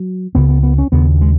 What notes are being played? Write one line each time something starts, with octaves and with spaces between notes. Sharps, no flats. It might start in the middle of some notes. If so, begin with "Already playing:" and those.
Already playing: F#3
C#2 C#3 B3
B3
B3
C#4
D#2 C#3 B3
G#3